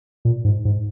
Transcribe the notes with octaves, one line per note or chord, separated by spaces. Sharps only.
A#2
G#2
G#2